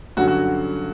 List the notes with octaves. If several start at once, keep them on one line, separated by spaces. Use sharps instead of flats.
G2 D3 F#3 C#4 F#4
F#4